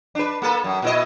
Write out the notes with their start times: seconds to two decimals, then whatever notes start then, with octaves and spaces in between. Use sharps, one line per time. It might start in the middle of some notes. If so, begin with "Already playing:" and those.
0.15 D4 B4
0.42 A#3 A4 B4
0.64 F#2
0.82 A#2 E4 D#5